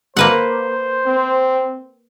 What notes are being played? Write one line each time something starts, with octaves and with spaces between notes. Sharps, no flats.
A#3 B4 C5 F#5
C4